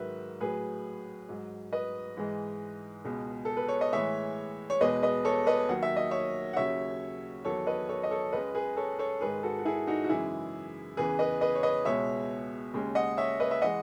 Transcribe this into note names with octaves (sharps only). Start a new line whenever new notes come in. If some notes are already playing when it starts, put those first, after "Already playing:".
Already playing: G#2 D#3 F#3 B4 E5
A2 F#3 G#4 B4
G#2 F#3
B4 D#5
G#2 E3 G#3
C#2 B2 G#3
A4
B4
C#5
D#5
A2 E3 G#3 C#5 E5
C#5
E2 B2 G#3 B4 D#5
B4 D#5
A4 C#5
B4 D#5
D#2 D#3 F#3 F#5
E5
D#5
C#5 E5
F#5
D#2 C#3 F#3 C#5 E5
E2 D#3 F#3 A4 C#5
B4 D#5
A4 C#5
D#5
A4 C#5
C#2 C#3 G#3 B4 D#5
G#4 B4
A4 C#5
A4 C#5
G#2 D#3 G#3 G#4 B4
F#4 A4
F#4
E4 G#4
D#4 F#4
F#4
F#2 C#3 E3 G#3 E4 G#4
E2 C#3 E3 G#4 B4
B4 D#5
B4 D#5
C#5
B4 D#5
C#2 B2 G#3 C#5 E5
D#2 C#3 G#3
D#5 F#5
C#5 E5
B4 D#5
E5
E3 G#3 D#5 F#5